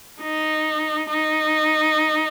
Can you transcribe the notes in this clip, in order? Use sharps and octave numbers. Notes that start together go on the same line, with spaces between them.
D#4
D#4